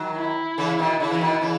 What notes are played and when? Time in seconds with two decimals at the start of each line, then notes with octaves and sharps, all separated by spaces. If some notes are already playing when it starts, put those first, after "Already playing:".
Already playing: D#3 F#3
0.16 E4
0.58 C#3 E3
0.79 B2 D#3
1.00 C#3 E4
1.11 E3
1.21 B2 D#3
1.41 C#3 E3